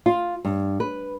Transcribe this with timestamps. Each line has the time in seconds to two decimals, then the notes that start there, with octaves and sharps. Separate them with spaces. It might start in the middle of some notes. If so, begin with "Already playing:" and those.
0.06 F4
0.45 G2
0.80 B4